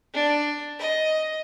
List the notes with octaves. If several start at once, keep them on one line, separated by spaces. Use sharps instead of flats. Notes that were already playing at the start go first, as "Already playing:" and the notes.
D4
D#5